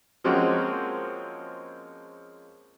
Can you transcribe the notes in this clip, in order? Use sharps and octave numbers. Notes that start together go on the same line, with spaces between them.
F3 G#3 A#3 C4 C#4 F#4